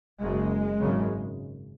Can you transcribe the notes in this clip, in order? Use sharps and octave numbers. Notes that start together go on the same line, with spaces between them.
F#1 F#2 C#3 G#3
G#1 F#2 C#3